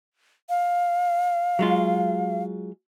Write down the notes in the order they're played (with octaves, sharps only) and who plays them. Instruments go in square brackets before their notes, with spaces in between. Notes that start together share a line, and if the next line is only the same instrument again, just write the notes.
[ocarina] F5
[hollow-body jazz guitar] F#3 G#3 F4